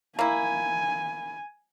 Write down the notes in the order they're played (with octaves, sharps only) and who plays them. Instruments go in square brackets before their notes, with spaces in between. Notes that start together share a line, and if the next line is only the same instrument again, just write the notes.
[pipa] A#3 E4 [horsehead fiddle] G#5